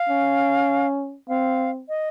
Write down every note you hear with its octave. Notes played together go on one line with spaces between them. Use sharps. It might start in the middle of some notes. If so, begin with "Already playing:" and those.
Already playing: F5
C#4
C4 F5
D#5